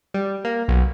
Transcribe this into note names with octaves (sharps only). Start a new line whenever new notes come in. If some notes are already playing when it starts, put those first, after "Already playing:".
G3
A#3
B1